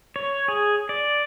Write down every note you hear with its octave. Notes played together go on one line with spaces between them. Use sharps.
C#5
G#4
D5